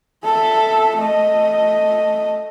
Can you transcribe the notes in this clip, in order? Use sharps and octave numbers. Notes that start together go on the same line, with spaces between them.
A4 E5
A3 D#5